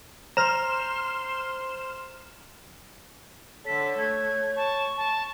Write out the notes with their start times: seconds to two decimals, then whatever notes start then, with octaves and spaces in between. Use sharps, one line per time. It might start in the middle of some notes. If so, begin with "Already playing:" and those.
0.37 C5 A#5 C6 F6 E7
3.66 D3 A4 C#5 B6
3.98 A3 G#6
4.56 A5 C#6
4.97 A5